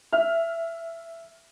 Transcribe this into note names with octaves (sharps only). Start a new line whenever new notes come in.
E5 F6